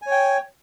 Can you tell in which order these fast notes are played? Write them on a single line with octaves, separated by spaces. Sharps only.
G#5 C#5 G5